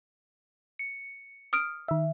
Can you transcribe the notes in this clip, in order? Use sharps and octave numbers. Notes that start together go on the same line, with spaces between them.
C#7
D#6 F6 D7
D#3 E5